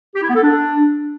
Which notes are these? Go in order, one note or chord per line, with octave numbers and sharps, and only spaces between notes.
G4
E4
B3
A4
D4